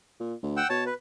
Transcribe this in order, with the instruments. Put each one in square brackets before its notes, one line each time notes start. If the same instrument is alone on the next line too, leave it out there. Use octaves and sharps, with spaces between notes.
[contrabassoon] A#2
D2
[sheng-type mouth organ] F#5 G5 E6
[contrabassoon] B2 [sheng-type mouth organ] C#5 A5
[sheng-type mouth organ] B4